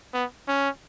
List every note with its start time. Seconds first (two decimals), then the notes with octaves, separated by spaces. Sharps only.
0.13 B3
0.48 C#4